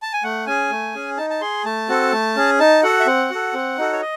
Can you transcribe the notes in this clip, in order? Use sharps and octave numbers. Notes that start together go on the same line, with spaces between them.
A5
G#5
A3 F#5
C#4 G#4 G#5
A3
C#4 G#4
D#4 A5
A5
G#4 C6
A3 A5
C4 F#4 A4
A3
C#4 G#4
D#4 A5
F#4 A4 F#5
E5
C4 F#5
F#4 A4
C4
D#4 F#4 A4
C#5
D#5